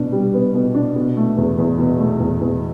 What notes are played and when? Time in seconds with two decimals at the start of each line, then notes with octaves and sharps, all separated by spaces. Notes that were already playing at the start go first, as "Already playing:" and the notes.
Already playing: B2 D4
0.12 G3
0.34 B3
0.55 B2
0.74 D4
0.96 B2
1.17 A3
1.37 E2
1.58 E2
1.78 B2
2.00 A3
2.20 E2
2.41 E2